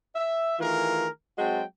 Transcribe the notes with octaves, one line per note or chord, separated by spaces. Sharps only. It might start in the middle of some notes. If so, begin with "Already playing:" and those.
E5
D#3 E3 A3 F4 G#4 A#4
F#3 G#3 C4 F#4 G5 A5